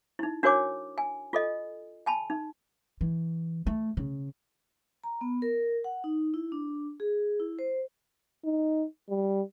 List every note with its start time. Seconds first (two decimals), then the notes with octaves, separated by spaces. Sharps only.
0.19 D#4 E4
0.43 D4 F#4 A#4 C#5 G#5 D6
0.98 G#5
1.33 F4 A4 D#5
2.06 G#5 A5 B5
2.30 D#4
3.01 E3
3.67 A3
3.97 C#3
5.04 A#5
5.21 B3
5.42 A#4
5.84 F#5
6.04 D#4
6.34 E4
6.52 D4
7.00 G#4
7.40 E4
7.59 C5
8.44 D#4
9.10 G3